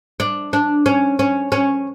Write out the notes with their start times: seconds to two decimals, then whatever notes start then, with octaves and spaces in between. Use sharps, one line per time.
0.20 D4
0.53 D4
0.86 C#4
1.19 C#4
1.52 C#4